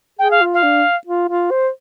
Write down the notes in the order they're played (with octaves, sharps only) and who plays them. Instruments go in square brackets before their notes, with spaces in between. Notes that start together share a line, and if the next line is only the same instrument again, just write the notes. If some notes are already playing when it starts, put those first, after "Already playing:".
[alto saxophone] G#4 [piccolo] G5
[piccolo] F5
[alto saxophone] F4
[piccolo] F5
[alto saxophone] D4
F4
F4
C5